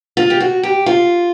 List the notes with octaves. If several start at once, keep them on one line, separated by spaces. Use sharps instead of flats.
F4
G4
F#4
G4
F4